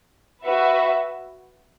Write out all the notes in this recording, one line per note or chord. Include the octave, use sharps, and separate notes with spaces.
F#4 B4 E5